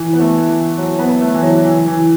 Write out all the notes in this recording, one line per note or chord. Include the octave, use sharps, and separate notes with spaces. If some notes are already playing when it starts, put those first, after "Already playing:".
Already playing: E3
B3
A3
E3
F#3
B3
A3
E3
F#3
E3
E3